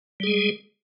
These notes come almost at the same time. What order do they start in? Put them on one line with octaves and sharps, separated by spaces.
G3 G#4 G#3